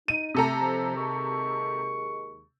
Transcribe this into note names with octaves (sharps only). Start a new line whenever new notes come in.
D#4 D#7
C3 A3 A4 A#5
F2 F3
D#2 G#3 C#6